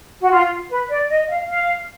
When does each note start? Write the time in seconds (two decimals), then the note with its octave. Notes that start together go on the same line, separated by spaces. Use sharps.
0.20 F#4
0.31 F4
0.70 B4
0.90 D5
1.09 D#5
1.29 F5
1.48 F5